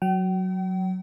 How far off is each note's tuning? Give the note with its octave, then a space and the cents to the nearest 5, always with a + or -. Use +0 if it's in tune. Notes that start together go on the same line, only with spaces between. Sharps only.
F#3 +0 G5 -45